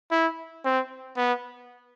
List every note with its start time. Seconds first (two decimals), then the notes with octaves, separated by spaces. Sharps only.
0.11 E4
0.65 C4
1.17 B3